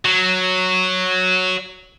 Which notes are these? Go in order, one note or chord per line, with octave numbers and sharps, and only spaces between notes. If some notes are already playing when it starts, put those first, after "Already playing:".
F#3